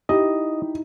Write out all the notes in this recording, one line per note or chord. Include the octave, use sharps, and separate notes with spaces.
D#4 E4 G4 D#5